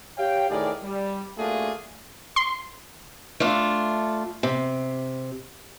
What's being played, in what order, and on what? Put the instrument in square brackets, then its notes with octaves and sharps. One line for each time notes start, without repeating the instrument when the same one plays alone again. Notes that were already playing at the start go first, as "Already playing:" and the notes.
[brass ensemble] G4 C#5 F5 G5
A2 D#3 G#4 A#4 D5
G3
A3 A#3 D4 F4 F#4 G#4
[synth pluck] C6
[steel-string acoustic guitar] A3 D4 F4
C3